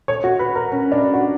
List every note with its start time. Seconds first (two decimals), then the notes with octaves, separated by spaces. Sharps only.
0.08 C#5
0.24 F#4
0.39 B4
0.55 A#4
0.72 C#4
0.92 D4
1.14 F#4